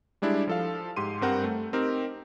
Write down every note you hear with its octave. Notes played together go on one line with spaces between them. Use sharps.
G3 G#3 D4 E4 G4
F3 A4 F5
G#2 G4 C6 D#7
G2 G3 C4 A#4 F#5 G6
A3
C4 D#4 G4 A#4